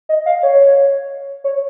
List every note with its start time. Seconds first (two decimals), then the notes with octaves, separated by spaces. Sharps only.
0.09 D#5
0.26 F5
0.43 C#5
1.44 C#5